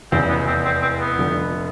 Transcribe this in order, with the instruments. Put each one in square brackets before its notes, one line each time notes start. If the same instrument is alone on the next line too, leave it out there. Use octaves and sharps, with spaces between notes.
[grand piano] F1 E2 C#3 [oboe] C4
[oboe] B3
C4
C4
C4
B3
[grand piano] F1 F2 D3